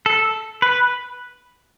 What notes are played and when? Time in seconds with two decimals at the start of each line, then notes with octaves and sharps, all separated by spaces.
0.06 A4
0.62 B4